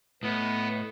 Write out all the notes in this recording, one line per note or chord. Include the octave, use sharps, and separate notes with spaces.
A2 B3 D#5